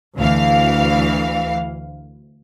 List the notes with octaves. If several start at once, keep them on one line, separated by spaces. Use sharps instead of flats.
D2 E3 F5